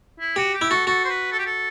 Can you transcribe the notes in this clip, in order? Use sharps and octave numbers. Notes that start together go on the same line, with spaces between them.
E4
F#4 G4
G4
E4
F#4 A4
F#4 A4
C5
B4
A4
G4
A4